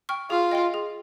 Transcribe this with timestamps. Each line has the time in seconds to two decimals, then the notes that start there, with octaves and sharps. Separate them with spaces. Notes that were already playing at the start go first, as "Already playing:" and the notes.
0.09 G5 C#6 F6
0.30 F4 G#4
0.51 D#5 G5 C6
0.74 G#4